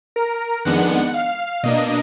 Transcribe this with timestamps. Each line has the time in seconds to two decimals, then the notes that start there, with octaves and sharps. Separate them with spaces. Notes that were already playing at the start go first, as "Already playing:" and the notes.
0.16 A#4
0.65 F2 D#3 G#3 B3 D4 F#5
1.14 F5
1.63 B2 A#3 D4 D#5